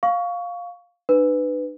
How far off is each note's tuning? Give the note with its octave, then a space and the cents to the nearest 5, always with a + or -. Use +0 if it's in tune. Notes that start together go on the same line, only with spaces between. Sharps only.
F5 +10 C#6 +20
D4 +45 B4 +15